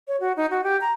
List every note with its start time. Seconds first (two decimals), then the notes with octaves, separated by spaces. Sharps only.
0.08 C#5
0.20 F#4
0.37 D#4
0.51 F#4
0.64 G4
0.81 A#5